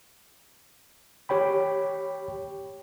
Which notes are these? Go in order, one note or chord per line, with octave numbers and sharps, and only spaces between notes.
G4 C#5 G5 B5